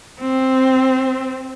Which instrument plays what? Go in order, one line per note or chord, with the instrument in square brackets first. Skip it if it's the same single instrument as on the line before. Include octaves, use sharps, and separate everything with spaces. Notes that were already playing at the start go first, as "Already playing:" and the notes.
[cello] C4